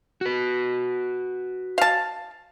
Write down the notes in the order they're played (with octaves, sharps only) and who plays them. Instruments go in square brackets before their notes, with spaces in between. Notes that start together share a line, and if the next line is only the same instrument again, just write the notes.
[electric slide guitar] F#4 B4
[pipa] F5 A5